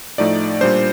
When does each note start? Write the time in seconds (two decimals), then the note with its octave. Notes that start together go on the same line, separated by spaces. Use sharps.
0.18 A2 F3 A3 D#4 D5
0.61 A#2 G3 D4 C5